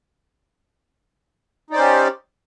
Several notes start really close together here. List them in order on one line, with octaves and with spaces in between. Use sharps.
D#4 D5 C5 C#4 G4